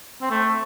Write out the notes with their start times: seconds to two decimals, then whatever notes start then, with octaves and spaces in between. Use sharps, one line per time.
0.21 C4
0.30 A3